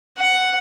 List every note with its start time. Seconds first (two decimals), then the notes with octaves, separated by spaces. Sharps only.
0.18 F#5